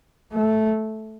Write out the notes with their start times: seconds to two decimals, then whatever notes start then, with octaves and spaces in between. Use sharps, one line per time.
0.32 A3